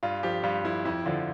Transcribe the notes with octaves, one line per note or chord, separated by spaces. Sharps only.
G2 F4
F3 G4
G2 F4
F3 E4
F2 E4
D3 F3 F4